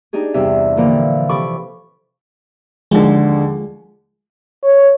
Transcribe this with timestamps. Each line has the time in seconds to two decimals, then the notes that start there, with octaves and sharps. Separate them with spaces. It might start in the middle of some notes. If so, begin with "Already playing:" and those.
0.13 D4 D#4 G4 G#4
0.34 E2 G2 C3 E5
0.77 A#2 D3 E3 F3 A#3
1.29 C3 A4 B5 C#6 D6
2.91 D#2 D3 F3 G#3
4.63 C#5